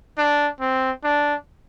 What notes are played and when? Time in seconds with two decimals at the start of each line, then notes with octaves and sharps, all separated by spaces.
0.18 D4
0.60 C4
1.04 D4